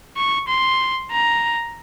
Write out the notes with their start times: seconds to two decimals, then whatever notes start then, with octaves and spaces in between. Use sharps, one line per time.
0.17 C#6
0.49 C6
1.12 A#5